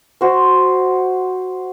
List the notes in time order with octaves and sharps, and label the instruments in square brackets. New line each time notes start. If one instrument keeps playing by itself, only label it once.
[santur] F#4 C5